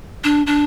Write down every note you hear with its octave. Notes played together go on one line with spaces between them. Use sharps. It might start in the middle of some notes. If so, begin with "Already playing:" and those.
D4
D4